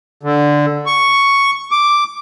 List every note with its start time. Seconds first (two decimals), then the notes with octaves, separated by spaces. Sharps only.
0.23 D3
0.86 C#6
1.71 D6